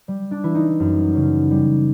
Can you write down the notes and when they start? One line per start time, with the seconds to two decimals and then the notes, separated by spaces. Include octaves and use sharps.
0.08 G3
0.31 D4
0.43 E3 E4
0.55 D#4
0.80 F#2
1.15 C#3
1.51 G3